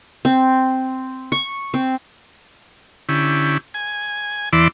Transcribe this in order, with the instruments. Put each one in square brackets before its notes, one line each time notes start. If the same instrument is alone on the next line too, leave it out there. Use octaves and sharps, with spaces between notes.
[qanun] C4
C#6
C4
[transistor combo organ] D3 C#4 E4 G4
G#5
E2 E3 E4 D5 C6 D6